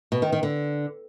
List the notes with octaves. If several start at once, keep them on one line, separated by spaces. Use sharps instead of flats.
B2
D#3
D#3
D3